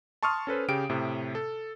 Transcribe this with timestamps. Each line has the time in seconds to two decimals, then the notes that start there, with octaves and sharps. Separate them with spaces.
0.23 A5 C6 C#6 D#6 F6
0.47 C#4 A4 B4 C5
0.68 C#3 G4 G5 D7
0.89 A2 C3
1.35 A4